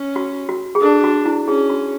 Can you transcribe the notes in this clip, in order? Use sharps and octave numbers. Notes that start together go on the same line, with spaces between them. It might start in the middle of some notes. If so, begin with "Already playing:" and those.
Already playing: C#4
F#4
F#4
G#4
D4 A4
F#4
E4
C#4 G#4
F#4